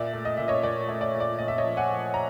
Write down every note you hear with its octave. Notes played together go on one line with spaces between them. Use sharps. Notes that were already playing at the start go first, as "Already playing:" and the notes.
Already playing: A#2 D5 E5
A3
D#5
A#2 E5
C#5 D#5
A#2 D5
A3
D5
A#2
D5
A#2 D#5
E5
C#5 D#5
F3
F#5 G#5
F3
A#5